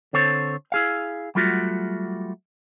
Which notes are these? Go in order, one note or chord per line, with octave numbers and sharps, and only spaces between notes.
D3 C4 A4 C5 C#5
E4 G#4 F5
F#3 G3 A3 F4 F#4